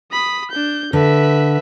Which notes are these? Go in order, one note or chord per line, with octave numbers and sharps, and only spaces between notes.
B5 D#6
D4 G6
D3 B4 E5